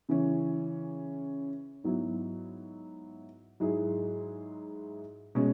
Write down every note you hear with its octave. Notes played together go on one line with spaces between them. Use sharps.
C#3 E3 C#4
G#2 F#3 B3 E4
G#2 F#3 E4 G#4
B2 G#3 C#4